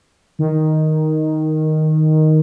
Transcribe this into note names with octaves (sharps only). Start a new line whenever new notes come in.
D#3